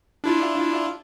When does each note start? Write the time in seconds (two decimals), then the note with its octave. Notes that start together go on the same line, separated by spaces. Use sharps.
0.24 D4 E4 F4